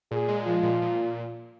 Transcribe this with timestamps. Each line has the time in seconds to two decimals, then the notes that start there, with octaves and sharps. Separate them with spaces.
0.11 A#2 G#4
0.28 G#3
0.47 F3 F4
0.63 A#2
0.82 A#2